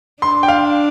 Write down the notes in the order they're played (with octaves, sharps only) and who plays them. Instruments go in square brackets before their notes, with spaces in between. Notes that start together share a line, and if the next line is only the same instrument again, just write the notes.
[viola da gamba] D4 [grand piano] C6
[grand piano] G5
F5